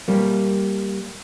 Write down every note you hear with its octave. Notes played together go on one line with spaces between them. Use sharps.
G3 A#3